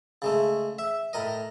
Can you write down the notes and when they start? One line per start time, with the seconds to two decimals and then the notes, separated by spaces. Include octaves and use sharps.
0.22 C#3 G#3 A3
0.79 E5
1.13 A2 A#4 D#5